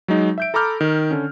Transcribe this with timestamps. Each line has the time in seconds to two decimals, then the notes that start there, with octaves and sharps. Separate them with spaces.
0.08 F#3 G#3 D#4
0.38 E5 G6 D7
0.54 A4 A#5 B5 D6 F6 G6
0.81 D#3
1.11 D3 C#4